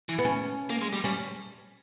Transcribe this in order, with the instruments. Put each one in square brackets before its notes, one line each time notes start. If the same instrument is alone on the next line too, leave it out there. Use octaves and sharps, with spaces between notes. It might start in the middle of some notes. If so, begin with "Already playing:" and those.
[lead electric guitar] E3
[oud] B3
C#4
[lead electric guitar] A#3
G#3
G3
[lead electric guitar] G3 [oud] C#4